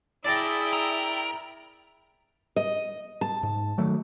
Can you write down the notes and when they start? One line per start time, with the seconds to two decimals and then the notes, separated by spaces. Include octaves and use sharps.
0.25 E4 G#4 D5 E5 G5 A5 A#5
0.73 A#4
2.56 D#5
3.21 A5
3.43 G#2
3.78 D#3 F#3 A3